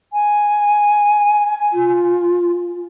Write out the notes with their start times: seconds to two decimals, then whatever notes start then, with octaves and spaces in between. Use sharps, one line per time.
0.13 G#5
1.73 F4